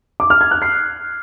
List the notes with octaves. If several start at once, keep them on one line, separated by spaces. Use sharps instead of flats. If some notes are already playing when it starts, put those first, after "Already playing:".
D6
F6
G#6
F#6
C7